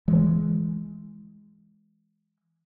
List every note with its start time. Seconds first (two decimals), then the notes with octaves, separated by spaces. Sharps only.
0.08 E3 G#3